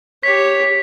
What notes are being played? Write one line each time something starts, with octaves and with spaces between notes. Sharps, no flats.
G4 C#5 B6